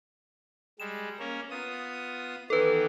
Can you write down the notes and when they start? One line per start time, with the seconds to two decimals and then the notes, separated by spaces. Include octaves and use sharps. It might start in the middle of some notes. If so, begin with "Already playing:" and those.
0.80 G3 G#3 E7
1.19 A#3 C#4 A#4
1.51 B3 F4 D#6
2.50 D#3 E3 B3 A4 B4